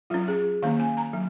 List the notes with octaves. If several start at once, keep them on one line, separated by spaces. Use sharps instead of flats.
F#3 C#4 F4
G#4
D#3 A#3 C#4 F5
G#5
A#5
F#3